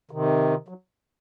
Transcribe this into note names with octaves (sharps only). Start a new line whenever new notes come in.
C3 D#3
F#3